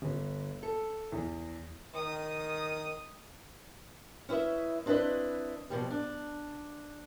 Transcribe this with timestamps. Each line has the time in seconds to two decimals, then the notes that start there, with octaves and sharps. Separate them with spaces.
0.02 G1
0.63 A4
1.12 E2
1.95 D#3 D#6
4.29 C#4 E4 B4 D#5 E5
4.86 C4 D4 E4 B4 D#5
5.70 B2 F3 G3
5.91 D4